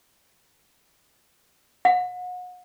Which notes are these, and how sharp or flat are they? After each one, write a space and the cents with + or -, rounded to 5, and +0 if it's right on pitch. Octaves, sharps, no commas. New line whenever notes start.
F#5 -35